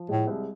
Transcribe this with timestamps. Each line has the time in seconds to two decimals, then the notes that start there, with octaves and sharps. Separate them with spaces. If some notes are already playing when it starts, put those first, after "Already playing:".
Already playing: F3
0.09 A2 G#3
0.27 C2